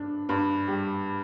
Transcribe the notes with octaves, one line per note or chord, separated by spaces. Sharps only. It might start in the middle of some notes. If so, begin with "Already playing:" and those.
Already playing: G2 D4
G2
G3